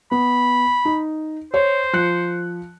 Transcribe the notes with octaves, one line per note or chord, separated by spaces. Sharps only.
B3 B5
D#4
C5 C#5
F3 F#6 C#7